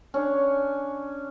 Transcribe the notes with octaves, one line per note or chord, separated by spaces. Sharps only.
C#4 D4